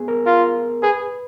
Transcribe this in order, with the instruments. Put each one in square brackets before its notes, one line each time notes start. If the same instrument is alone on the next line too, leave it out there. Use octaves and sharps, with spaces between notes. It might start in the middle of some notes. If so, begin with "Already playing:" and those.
Already playing: [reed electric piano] B3 G#4
A#4
[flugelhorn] F4 [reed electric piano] A#4
[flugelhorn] G#4 [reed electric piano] B4